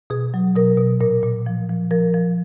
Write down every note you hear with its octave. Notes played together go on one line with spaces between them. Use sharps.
B2 G#4
F#3
B2 A#4
B2
A#2 A#4
A#2
F3
F3
F3 A#4
F3